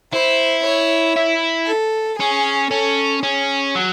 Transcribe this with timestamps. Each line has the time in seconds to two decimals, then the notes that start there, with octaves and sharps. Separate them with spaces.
0.13 E4 C5
0.64 C#5
1.16 E4
1.68 A4
2.19 C#4 G#4
2.71 C#4 A4
3.23 C#4 G#4
3.75 F#3